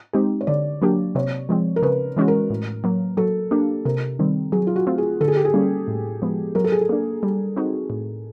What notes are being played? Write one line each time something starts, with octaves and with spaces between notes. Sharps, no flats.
G#3 C4 D#4 G4
C#5
D3 D5
F#3 A#3 D4 G4
C3 C#5
F3 G#3 C4
A#4
C#3 B4
E3 G#3 C#4 F#4
A#4
A2
F#3 A#3
F#3 A4
A#3 D4 G4
C3 A#4
D#3 G3 C4
F#3 G#4
F4
F#4
A3 C4 F4
G#4
D3 A4
G#4
G4
G#4
G3 A#3 C#4
A2
F3 G#3 B3
F#3 A#4
A4
G#4
A4
A#3 D4
G3
C4 D#4 F#4
A2